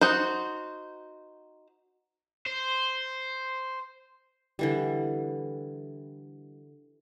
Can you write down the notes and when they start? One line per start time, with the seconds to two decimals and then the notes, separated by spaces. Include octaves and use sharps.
0.01 D#4 F#4 C5
2.47 C5
4.59 D3 E3 G3